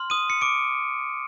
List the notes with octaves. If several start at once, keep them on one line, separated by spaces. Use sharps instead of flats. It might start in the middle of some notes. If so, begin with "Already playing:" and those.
Already playing: C6 F6
D#6 D#7
C#7
D6 D7